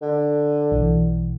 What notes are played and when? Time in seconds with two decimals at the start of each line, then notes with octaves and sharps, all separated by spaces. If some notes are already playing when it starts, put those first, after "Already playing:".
0.02 D3
0.72 B1 E3